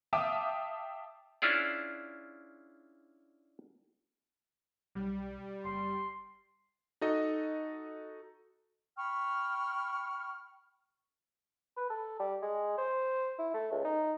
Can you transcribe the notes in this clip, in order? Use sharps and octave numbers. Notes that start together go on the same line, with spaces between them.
E5 F5 G5 A5 D6 D#6
C#4 D4 E4 F4 G#4 D5
B1 G3
F#1 C6
D#4 F#4 A4 D#5
G5 B5 C#6 F6
B4
A4
G3
G#3
C5
E4
A3
C#2
D#4